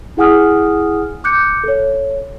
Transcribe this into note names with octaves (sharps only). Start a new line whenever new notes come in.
E4 G#4 F#5 G#5 D#6 F6
D6 F#6 G6 C#7
A4 C#5